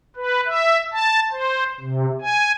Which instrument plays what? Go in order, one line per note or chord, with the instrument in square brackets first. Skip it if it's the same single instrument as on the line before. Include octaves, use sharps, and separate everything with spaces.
[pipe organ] B4
E5
A5
C5
C3
G#5